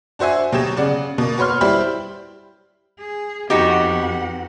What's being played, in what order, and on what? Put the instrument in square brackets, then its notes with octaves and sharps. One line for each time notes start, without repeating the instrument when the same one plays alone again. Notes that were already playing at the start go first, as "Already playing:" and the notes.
[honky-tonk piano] D4 F#4 C5 E5 G#5
B2 F#3 G4 E7
C#3 D5 F#5
B2 A#3
F#4 B4 C#5 C6 F6
G3 E4 G4 C5 B5
[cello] G#4
[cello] F2 F#5 [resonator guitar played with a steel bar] B3 D#4 F#4 [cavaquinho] G4